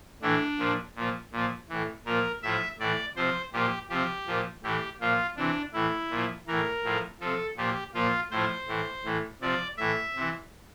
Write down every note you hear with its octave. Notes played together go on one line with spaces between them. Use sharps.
A2 E3 D4
A#2 F3
A#2 F3
A#2 F3
A2 E3
A#2 F3 A#4
A2 F3 E5
A2 E3 D5
C3 F3 C5
A#2 F3 G4
C3 F3 G4
A#2 F3
A2 E3 G4
A#2 F3 F4
C3 E3 D4
A2 E3 E4
A#2 F3
A2 E3 A#4
A2 F3
C3 F3 A4
A#2 F3 G4
A#2 F3 F4
A2 F3 C5
A2 E3
A2 E3
C3 F3 D5
A2 E3 E5
C3 E3